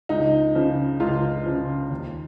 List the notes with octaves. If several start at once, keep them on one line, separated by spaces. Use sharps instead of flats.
C#2 D#4
C#3 F3
C#2 F4
C#3 F3
D#2